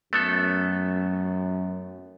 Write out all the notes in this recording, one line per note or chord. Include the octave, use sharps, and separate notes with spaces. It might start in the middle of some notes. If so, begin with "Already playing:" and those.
F#2 A3 B3 A4